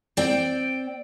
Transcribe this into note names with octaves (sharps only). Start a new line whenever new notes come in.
C4 D5 G5